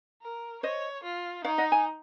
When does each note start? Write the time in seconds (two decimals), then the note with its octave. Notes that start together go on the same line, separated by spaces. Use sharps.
0.22 A#4
0.63 C5 C#5 D#5
1.03 F4
1.44 D#4 C#5 F5
1.58 D#5 F#5
1.72 G#5